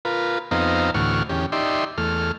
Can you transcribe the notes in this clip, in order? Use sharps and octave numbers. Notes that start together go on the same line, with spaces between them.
F4 A#4 B4
F2 B3 C4 D#4 F5 A#5
D2 A2 E3 F#5 C#6 F6
E2 C#4 G4
D#4 G4 D5 E5 C6
E2 A3 F6